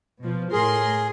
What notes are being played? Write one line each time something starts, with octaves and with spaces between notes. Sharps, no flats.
B2 F3
A2 G#4 A#4 C6